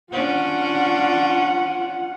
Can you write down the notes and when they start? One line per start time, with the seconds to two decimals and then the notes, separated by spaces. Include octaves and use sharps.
0.12 C#4 D4 F4 F#5